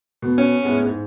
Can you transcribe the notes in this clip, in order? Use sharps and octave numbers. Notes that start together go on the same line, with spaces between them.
B2
C#4
A2 G#3 B3
G#2